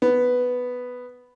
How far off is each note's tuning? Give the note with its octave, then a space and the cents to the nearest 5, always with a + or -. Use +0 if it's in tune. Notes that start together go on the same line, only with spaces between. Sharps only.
B3 +5